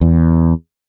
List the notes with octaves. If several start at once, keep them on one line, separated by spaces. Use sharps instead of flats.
E2